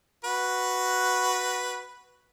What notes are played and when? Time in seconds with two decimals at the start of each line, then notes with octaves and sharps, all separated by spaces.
0.24 F#4 B4